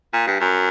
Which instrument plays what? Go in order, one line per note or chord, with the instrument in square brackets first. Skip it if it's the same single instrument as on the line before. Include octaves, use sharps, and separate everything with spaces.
[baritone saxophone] A#2
G2
F#2